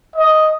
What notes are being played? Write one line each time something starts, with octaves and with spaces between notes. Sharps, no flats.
D#5